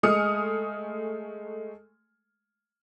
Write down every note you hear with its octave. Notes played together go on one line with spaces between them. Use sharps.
G#3 A3 G#5 D#6 F6 C#7